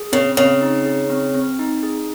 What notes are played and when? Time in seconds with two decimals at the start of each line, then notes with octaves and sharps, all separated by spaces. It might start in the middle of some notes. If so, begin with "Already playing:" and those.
Already playing: G#4
0.12 C#3 C4
0.37 C#3 C4
0.61 D#4
0.86 G#4
1.10 C4
1.34 C4
1.59 D#4
1.83 G#4